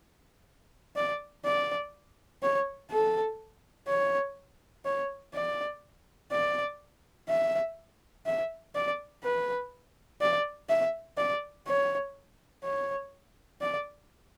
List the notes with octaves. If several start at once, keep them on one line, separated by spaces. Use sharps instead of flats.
D5
D5
C#5
A4
C#5
C#5
D5
D5
E5
E5
D5
B4
D5
E5
D5
C#5
C#5
D5